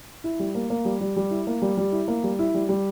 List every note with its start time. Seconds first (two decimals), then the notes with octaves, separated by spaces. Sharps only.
0.24 E4
0.39 G3
0.55 A#3
0.70 A#3
0.85 G3
1.00 G3
1.17 G3
1.31 E4
1.47 A#3
1.62 G3
1.77 G3
1.92 E4
2.08 A#3
2.24 G3
2.39 E4
2.54 G3
2.69 G3